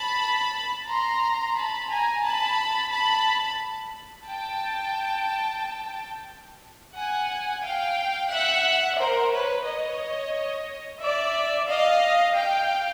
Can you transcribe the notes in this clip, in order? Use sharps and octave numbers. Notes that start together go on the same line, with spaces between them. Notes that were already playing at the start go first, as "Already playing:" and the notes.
Already playing: A5 B5
A#5 C6
A5 B5
G#5 A#5
A5 B5
A5 B5
G5 A5
F#5 G#5
F5 G5
E5 F#5
A#4 C5
B4 C#5
C#5 D#5
D5 E5
D#5 F5
F5 G5